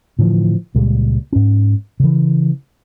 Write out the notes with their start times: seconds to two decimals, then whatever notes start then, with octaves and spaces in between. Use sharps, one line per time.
0.19 A2 D3 E3 F3
0.75 C#2 A#2 G3 G#3
1.33 G#2 C#4
2.00 C#3 E3